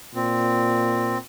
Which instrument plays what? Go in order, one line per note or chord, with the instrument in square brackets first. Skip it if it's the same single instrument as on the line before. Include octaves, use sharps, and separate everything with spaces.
[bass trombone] A#2 [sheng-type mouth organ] C4